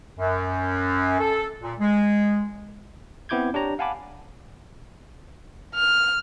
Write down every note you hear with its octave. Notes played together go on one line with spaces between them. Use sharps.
F#2
A4
A#2
G#3
B3 C4 E4 D6 G6 G#6
D4 G4 C#5 A#5
F5 F#5 G#5 A5 B5 D6
F6